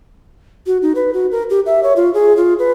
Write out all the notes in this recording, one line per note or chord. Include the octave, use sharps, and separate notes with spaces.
F#4
D#4
B4
F#4
A#4
G4
E5
C#5
F4
G#4
F4
B4